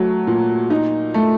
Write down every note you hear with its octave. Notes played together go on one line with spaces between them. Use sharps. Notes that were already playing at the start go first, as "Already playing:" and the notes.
Already playing: F#3 A3
A#2
D#4
A3